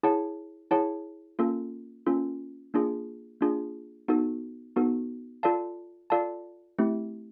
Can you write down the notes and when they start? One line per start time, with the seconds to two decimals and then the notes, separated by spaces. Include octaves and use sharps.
0.03 E4 G#4 C#5 F#5 A5
0.71 E4 G#4 C#5 F#5 A5
1.39 A#3 C#4 F4 A4
2.07 A#3 C#4 F4 A4
2.74 A#3 D4 F4 G#4
3.41 A#3 D4 F4 G#4
4.08 B3 D#4 F#4 A4
4.76 B3 D#4 F#4 A4
5.43 F4 A4 D5 F5 A5
6.10 F4 A4 D5 F5 A5
6.78 A3 C4 E4 G4